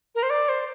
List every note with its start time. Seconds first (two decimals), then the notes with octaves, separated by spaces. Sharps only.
0.15 A#4
0.23 C5
0.30 D5
0.49 C5